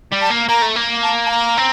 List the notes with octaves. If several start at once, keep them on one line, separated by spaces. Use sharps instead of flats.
G3
A5
A#3
A#3 A#5
A3
A#3
A5
A5
A#5
C4